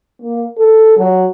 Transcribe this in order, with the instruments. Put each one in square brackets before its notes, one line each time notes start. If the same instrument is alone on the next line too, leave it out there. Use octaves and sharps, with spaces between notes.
[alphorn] A#3
A4
F#3